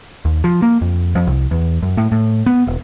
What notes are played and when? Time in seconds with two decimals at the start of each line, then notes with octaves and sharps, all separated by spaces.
0.25 D#2
0.44 F3
0.62 A#3
0.81 F2
1.15 F2
1.27 C2
1.51 E2
1.83 F#2
1.97 A2
2.12 A2
2.46 B3
2.67 E1